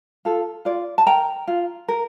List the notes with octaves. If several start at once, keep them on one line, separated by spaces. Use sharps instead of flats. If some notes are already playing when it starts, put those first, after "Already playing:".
F4 A4
F4 D5
A5
A#4 G5 A#5
F4
A#4